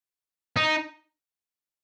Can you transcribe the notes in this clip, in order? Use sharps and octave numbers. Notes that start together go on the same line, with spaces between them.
D#4